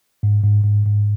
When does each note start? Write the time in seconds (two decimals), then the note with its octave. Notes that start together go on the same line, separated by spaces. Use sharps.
0.23 G#2
0.43 G#2
0.64 G#2
0.86 G#2